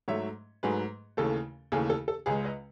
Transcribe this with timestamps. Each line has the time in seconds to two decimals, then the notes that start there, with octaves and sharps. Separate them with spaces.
0.08 G#2 F#3 A3 C#5 E5
0.63 G#2 F#3 A3 G#4 B4
1.17 D#2 C#3 E3 A3 A4
1.72 D#2 C#3 E3 A3 G#4
1.90 A4
2.08 A4
2.26 C#2 C#3 G#3 G#4 B4
2.44 B4 D#5